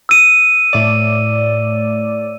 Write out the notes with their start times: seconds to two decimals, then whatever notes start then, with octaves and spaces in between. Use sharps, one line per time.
0.09 E6 D#7
0.73 A2 D5